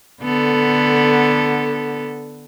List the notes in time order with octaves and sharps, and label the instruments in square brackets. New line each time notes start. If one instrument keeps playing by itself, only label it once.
[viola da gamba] D3 B3 A4